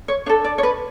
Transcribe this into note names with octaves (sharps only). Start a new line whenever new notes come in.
C#5
D4 A4 C#5
D5
C#5
B4